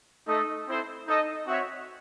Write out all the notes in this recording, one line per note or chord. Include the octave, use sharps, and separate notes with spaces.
A3 D#4 A4 D#5
C4 E4 A4 C5
D#4 A4 D#5
C4 F#4 C#5 E5